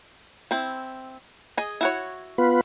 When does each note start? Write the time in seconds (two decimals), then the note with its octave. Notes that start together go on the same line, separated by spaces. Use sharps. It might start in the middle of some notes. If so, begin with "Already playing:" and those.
0.51 C4 E4
1.57 G#4 D#5
1.81 E4 F#4 C#5
2.38 B3 F4 B4